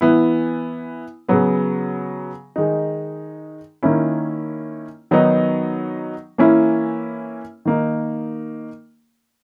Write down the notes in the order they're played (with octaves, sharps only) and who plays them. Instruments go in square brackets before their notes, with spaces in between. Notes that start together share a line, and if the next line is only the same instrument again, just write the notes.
[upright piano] E3 B3 E4
C#3 F#3 B3
D#3 G#3 D#4
D#3 A#3 C#4 E4
D#3 F#3 B3 D#4
E3 A#3 C#4 E4
D#3 A#3 D#4